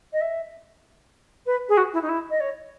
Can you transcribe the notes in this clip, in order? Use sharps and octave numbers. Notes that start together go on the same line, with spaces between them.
D#5
E5
B4
G#4
F#4
E4
D#4
E4
D#5
C#5